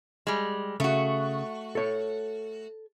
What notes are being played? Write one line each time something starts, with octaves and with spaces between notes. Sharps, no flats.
G3 G#3
C#3 A3 F#4
A4 C#5